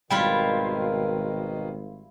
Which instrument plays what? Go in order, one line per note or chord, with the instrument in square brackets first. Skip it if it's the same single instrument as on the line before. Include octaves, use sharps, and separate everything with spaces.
[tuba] G#1 [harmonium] B2 D#3 [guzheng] G3 E4 F4 [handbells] G5